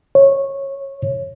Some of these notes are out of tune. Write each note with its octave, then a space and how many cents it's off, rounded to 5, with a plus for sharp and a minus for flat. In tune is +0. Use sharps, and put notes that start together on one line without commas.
C#5 -15